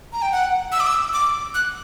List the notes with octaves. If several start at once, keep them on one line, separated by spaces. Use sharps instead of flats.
A#5
G5
F#5
E6
D6
E6
D6
F#6